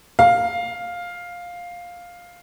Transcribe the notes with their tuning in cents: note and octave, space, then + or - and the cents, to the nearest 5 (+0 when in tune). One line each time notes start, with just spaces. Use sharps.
F5 +5